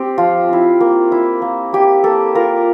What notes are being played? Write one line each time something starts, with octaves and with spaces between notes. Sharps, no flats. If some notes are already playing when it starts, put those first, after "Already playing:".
Already playing: C4 G4
F3 F4
C4 E4
A#3
E4
A#3
E4 G4
A#3 A4
F4 A#4